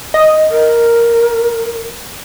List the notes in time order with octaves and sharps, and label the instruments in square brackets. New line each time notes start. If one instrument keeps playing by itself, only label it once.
[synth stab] D#5
[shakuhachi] A#4